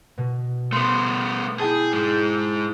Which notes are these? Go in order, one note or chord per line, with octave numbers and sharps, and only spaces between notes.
B2
A3 B3 C6
E4 G#4 G5 A5
G#2 G#3